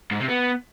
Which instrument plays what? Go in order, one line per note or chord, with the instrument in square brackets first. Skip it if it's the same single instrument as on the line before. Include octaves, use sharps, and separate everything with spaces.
[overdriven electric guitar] G#2
C3
B3